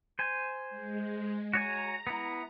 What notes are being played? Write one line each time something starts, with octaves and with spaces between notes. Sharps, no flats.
C5 G#5
G#3
F#4 C#5 G#5 A#5
B3 E4